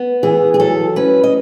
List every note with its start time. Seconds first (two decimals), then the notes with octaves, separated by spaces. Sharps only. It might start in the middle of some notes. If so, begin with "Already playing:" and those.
Already playing: B3
0.23 E3 G#4
0.54 G#4
0.60 F#3 A4
0.96 C#4 B4
1.24 D#5